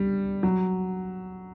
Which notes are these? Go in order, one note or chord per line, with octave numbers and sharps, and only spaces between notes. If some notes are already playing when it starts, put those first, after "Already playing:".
Already playing: G3
F#3